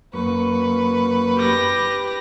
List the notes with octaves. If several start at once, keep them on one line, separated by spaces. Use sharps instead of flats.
F#2 A#3 B4 C#6
G4 A#6